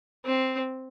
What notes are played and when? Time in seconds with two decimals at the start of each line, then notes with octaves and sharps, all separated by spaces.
0.25 C4